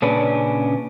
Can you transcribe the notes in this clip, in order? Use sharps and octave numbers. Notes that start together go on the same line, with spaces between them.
A#2 C#3 C#4 D4 B4